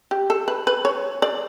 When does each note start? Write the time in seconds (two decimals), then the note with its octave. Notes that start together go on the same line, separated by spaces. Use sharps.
0.11 G4
0.30 A4
0.48 B4
0.67 B4
0.85 C#5
1.22 D5